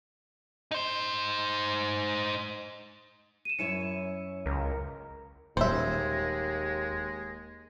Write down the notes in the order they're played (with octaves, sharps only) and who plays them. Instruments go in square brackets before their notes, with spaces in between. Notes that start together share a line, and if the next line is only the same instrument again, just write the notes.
[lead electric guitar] D#4 C5
[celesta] D#7 E7
[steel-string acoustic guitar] F#2 E4 C#5 [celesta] C#7
[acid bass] C#2 [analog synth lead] A#4
[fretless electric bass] D#1 [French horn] D#2 [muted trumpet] G#3 [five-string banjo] C5 E5